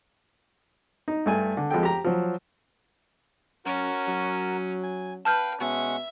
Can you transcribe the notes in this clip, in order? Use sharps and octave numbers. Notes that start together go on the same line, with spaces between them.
D#4
G2 A3 G#5
D3
F2 G#3 A4 G5
G4 A#5
F3 F#3
F#2 C#4 F#4 A#4
F#3
G#5
B4 F5 G5 A5 F6 G6
B2 G#3 C#4 E5 F#5